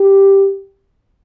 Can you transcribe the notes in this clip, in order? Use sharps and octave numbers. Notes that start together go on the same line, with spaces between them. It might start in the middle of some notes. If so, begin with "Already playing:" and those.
Already playing: G4